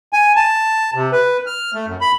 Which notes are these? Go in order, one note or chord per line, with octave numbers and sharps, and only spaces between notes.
G#5
A5
C3
B4
F6
A3
F#2
B5